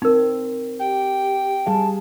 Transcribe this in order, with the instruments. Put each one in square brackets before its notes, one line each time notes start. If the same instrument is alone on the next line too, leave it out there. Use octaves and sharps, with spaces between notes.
[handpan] C4 [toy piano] D#4 A#4
[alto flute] G4 [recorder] G5
[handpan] G3 G#4 F5 [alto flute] A5